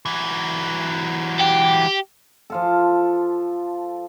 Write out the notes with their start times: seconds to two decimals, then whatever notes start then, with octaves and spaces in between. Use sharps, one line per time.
0.05 E3 F#3
1.41 G4
2.50 F3 F4 A4